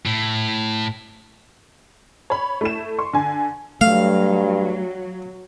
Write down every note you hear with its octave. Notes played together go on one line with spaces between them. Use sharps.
A2
C#5 B5
A3 E4 E7
C6 C#6
D3 G#5
G2 F#3 A3 F5